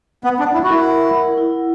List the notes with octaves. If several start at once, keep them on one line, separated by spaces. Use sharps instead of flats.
B3 F#5
D4
F#5
E4
F#4
E4 A#4
A#4
F#5
E4